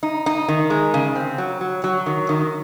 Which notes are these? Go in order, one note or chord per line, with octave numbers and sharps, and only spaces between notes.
D#4
D#4
D#3
G#3
C#3
C4
F#3
F#3
F#3
D#3
D#3